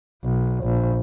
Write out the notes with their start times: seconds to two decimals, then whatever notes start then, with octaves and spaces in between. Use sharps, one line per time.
0.25 B1
0.65 A#1